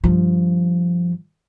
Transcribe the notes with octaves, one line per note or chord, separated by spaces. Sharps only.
G2 F3